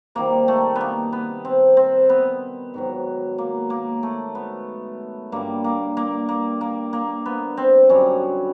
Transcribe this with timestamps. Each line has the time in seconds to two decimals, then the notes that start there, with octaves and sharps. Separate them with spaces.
0.15 C3 D#3 G3 A#3
0.48 A3
0.76 B3
0.81 A#3
1.12 B3
1.45 C4
1.77 C4
2.09 B3
2.74 G#2 D#3 F#3
3.38 A#3
3.70 A#3
4.03 A3
4.35 B3
5.32 G2 D3 G3 A#3
5.64 A#3
5.97 A#3
6.29 A#3
6.61 A#3
6.93 A#3
7.26 B3
7.57 C4
7.89 F#2 D3 G3 C#4